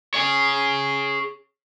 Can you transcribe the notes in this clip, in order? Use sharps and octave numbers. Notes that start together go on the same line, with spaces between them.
G#4 C#5